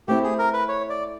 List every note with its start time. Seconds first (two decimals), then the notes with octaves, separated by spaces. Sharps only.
0.08 A3 C4 E4 G4
0.23 G#4
0.39 A#4
0.53 B4
0.68 C#5
0.89 D5